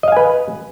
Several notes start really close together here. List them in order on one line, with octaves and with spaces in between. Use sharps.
D#5 F5 G#5 B4